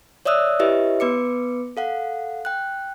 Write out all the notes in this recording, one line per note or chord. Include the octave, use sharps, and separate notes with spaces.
C#5 D5 E5 D#6 E6 F#6
E4 G4 B4 C#5 D#5 E5
B3 B4 D6 C#7
A4 F5 F#5
G5 F#6